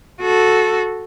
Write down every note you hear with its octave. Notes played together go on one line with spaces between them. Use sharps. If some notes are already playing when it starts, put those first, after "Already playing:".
F#4 A4